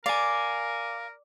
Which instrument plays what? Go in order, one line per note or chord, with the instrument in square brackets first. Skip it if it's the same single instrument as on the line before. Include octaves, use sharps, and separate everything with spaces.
[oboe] A#4 [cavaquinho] D5 [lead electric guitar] F5 G#5